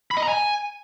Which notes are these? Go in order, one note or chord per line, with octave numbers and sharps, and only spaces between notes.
B5
D#5
A#5
G#5